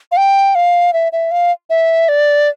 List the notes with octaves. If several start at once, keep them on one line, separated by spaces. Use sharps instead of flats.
F5
G5
F5
E5
E5
F5
E5
D5